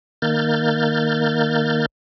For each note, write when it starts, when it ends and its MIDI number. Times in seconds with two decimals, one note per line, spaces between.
0.22 1.86 51
0.22 1.86 58
0.22 1.86 89
0.22 1.86 91
0.22 1.86 93